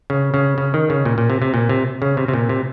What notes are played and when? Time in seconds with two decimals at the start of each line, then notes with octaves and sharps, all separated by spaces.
0.10 C#3
0.34 C#3
0.58 C#3
0.74 D#3
0.90 C#3
1.05 A#2
1.18 A#2
1.30 C3
1.42 C3
1.54 A#2
1.69 C3
2.02 C#3
2.17 C3
2.28 C3
2.34 A#2
2.49 C3